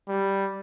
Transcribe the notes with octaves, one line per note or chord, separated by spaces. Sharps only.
G3